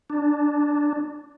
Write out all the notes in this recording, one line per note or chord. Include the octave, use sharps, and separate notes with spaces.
D4